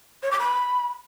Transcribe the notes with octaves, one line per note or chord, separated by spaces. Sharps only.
C#5
D6
B5